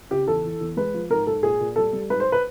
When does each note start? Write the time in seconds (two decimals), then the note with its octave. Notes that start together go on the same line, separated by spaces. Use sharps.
0.10 C#3 G4
0.27 E2 A4
0.44 E3
0.61 E2
0.77 G#3 B4
0.94 F3
1.10 G#2 A#4
1.27 G#2 A4
1.43 A#2 G#4
1.60 A#2
1.76 G3 A4
1.93 G3
2.10 G#2 B4
2.20 C5
2.32 B4